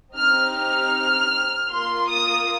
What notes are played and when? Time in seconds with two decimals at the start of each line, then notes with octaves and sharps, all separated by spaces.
0.15 C4 D#4 G4 F6
0.54 F6
1.71 A#3 F4 C6
2.10 D#6